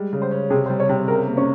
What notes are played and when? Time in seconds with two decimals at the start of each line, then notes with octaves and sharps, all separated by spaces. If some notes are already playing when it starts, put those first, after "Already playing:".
Already playing: G3 G#3
0.13 C#3
0.22 C5
0.31 C#4
0.50 C3 G#4
0.66 C5
0.70 G3
0.80 C#5
0.89 C3
1.08 C#3 A#4
1.27 A#3
1.37 C#4